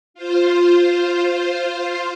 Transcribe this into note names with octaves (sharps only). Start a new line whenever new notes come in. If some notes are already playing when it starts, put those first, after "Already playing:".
F4 C5